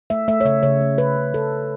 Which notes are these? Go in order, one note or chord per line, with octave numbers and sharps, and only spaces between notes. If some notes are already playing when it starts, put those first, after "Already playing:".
A3 E5
A3 E5
C#5
C#3 E5
C#3 C#5
A3
C#3 B4
C#3
C#3 A4
C#3